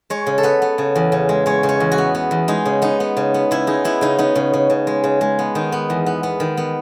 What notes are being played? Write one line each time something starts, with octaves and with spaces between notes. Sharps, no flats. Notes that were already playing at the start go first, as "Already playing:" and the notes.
G#3 C#5
C#3
A4
B3 B4
B3
C#3
E2
C#3
G#3
G#3 C#5
C#3
C#5
E2
F#4
B3
B3
E2
G#3 D#4
C#3
B3 D#4
B3
C#3
B3
C#3 E4
G#3 D#4
B3 E4
C#3 D#4
B3 D#4
C#3
C#3
C#3
G#3
C#3
G#3
B3
D#3 D#4
B3
E2
B3
B3
D#3
B3